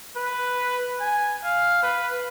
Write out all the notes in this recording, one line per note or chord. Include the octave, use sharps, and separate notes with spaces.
B4
G#5
F5
B4